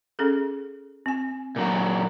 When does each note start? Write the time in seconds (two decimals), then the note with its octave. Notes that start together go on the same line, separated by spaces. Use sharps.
0.19 C#4 G#4 A4
1.06 C4 G#5
1.56 A#2 F#3 F#4